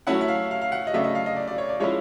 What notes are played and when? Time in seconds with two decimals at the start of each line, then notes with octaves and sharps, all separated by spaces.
0.07 F#3 A3 C#4 E4 F#5
0.21 E5
0.28 F5
0.51 F5
0.62 F5
0.72 F#5
0.87 D#5
0.93 C#3 F#3 A3 D4 E5
1.04 D#5
1.15 F5
1.26 D#5
1.36 D5
1.48 D5
1.58 C#5
1.69 D5
1.80 F3 G#3 C#4 E4 C#5